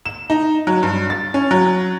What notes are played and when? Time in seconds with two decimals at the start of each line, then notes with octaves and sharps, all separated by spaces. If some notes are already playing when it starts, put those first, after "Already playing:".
0.05 E7
0.30 D#4
0.67 F#3
0.83 G2
1.10 A6
1.34 C#4
1.51 F#3